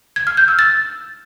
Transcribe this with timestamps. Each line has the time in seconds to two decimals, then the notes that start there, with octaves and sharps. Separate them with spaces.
0.16 G#6
0.27 F6
0.37 G6
0.48 E6
0.59 A6